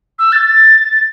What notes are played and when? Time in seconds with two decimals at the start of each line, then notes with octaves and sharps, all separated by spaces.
0.19 E6
0.32 A6
0.45 A6